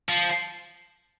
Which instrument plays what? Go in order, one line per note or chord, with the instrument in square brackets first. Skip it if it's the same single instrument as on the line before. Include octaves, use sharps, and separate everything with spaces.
[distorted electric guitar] F3